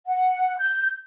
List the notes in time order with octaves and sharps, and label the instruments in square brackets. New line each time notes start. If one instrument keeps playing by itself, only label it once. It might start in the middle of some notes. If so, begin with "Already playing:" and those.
[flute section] F#5
G6